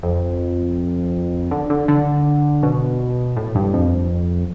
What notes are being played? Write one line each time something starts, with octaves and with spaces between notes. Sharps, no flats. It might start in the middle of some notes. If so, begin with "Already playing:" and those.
F2
D3
D3
D3
B2
A2
G2
F2